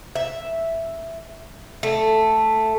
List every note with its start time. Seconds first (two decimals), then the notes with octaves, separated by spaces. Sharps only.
0.16 E5
1.83 A3